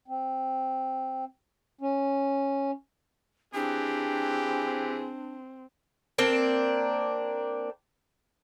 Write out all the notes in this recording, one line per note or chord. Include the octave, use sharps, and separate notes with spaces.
C4
C#4
E3 C4 D4 G4 G#4
A#3 C4 D4